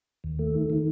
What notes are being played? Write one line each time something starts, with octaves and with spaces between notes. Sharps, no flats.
D#2
A3
D#3
D#3